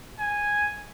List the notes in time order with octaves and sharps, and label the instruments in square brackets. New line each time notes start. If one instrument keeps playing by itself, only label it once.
[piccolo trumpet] G#5